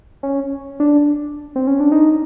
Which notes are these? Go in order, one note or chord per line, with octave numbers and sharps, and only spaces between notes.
C#4
D4
C4
C#4
D4
D#4